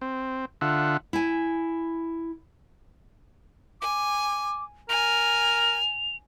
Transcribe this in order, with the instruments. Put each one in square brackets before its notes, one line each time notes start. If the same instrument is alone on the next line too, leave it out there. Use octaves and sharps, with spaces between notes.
[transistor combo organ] C4
D3 F4 E5 F#5
[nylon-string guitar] E4 G#5
[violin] G#5 [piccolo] D6
[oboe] A#4 [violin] G#5 [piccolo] F7